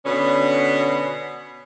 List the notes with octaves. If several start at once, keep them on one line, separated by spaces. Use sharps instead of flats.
B2 D3 B3 C#4